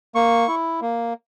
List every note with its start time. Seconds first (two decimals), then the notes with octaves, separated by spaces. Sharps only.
0.15 A#3 C#6
0.48 E4
0.81 A#3